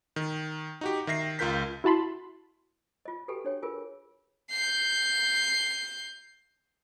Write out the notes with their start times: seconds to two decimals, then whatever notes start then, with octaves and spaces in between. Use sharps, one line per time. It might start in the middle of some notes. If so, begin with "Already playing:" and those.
0.16 D#3
0.81 D#4 F#4 G4
1.07 D#3 E5 A#6 C7
1.39 C#2 F4 A#4 G6 B6
1.84 E4 F#4 A5 B5 C6
3.05 F4 D#5
3.28 F#4 G4 A4 B4 G5 G#5
3.44 D4 C#5 G5
3.63 F4 G#4 A#4 B4 G#5
4.51 G6 C7